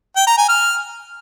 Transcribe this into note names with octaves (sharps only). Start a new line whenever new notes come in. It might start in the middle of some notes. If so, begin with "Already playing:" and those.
G5
A#5
G#5
F6